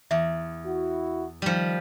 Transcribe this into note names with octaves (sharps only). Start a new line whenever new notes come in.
E2 E5
E4 F#4
D#3 F3 G3